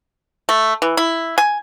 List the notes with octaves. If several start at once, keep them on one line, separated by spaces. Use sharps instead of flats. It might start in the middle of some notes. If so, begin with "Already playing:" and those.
A3
E3
E4
G#5